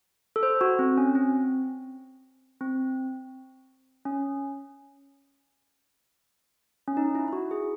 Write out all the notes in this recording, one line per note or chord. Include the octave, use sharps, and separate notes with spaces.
A4
C5
F#4
C4
C#4
C4
C4
C#4
C#4
D#4
E4
E4
F#4
G#4